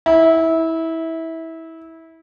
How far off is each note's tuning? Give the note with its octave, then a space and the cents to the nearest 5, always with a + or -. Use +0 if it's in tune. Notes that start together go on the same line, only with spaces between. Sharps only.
E4 -20